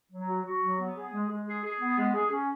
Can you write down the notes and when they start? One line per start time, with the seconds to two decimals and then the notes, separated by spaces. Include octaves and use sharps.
0.11 F#3
0.27 F#4
0.45 F#4
0.61 F#3
0.79 B3
0.95 G#4
1.13 G#3
1.29 G#3
1.47 G#4
1.64 G#4
1.80 B3
1.98 G#3
2.14 G#4
2.31 C#4